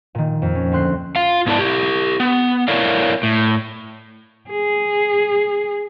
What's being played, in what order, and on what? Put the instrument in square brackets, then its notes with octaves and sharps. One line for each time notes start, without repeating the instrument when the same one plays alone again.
[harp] A#2 D#3
F2
C#4
D2 C4 C6 F#6 C7
[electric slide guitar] F4 F5
G#2 B3 E4 D5 A5
E4 G4
B3
E4 A#4 C#5 D5 F5
A2
[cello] G#4